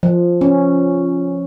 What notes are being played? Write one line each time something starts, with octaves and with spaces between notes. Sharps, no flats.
F3
C#4